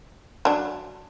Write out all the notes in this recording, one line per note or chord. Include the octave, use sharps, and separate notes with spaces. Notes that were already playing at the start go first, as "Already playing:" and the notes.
F#3 D4